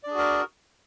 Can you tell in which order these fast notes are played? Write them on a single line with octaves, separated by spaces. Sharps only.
D5 D4 G#4 F#4 A#4